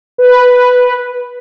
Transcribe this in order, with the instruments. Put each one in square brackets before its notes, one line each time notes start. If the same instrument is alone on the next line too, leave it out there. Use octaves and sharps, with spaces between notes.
[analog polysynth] B4